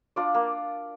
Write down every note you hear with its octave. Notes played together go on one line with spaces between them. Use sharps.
D4 F4 D5
A#3